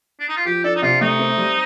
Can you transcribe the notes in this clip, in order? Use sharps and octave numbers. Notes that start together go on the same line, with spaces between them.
D4
D#4
F4
F3 G4
D4 A4
D#4
C3 F4
A3 D#4
C4
G3